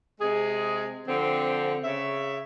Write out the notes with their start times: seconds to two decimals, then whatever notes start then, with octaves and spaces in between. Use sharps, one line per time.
0.21 C3 G#3 G#4
1.08 D3 F3 C4
1.83 C#3 E5